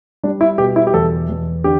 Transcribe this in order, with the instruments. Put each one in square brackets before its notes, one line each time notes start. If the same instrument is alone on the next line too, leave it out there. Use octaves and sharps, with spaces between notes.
[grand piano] G3 D4
E4
B2 G4
E4
G4
E2 A4
E2
D3 G4